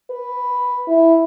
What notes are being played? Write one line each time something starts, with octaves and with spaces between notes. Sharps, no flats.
B4
E4